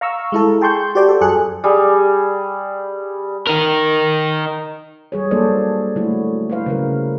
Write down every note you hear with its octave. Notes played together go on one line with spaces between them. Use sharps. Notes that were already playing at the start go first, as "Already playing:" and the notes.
F5 A#5 C#6 E6
G#3 E4 A4
G#4 G5 A5 C6 C#6 G6
F#4 G4 C5 D5 G5 A5
A4
F#2 G#4 A4 F#6 C#7
G3 G#4
D#4 A#4
G3 G#4 C#5
F#3 A#3 D4 A4 C5 D5
D3 F#3 A3 E4 F#4
E4 B4 C5 F5
C#3 F#3 A#4